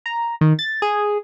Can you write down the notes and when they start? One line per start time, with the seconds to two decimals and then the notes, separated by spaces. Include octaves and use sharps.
0.06 A#5
0.41 D#3
0.59 A6
0.82 G#4